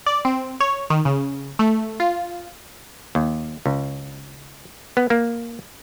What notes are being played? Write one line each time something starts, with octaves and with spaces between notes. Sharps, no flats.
D5
C4
C#5
D#3
C#3
A3
F4
D#2
C#2
B3
A#3